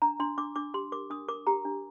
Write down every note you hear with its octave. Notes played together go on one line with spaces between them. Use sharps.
D4 A#5
D4 C6
D4 D6
D4 D6
G4 C6
A#4 D6
D4 D#6
A#4 D6
G4 A#5
D4